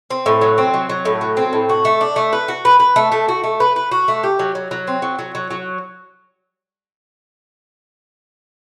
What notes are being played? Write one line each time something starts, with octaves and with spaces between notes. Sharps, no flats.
C4
A2
F#3
C4
F#3
F#3
A2
F#3
C4
A2
F#4
A3
D4
A3
B4
F#4
B4
B4
A3
A3
F#4
A3
B4
B4
F#4
A3
G4
F#3
F#3
F#3
C4
F#3
F#3
F#3
F#3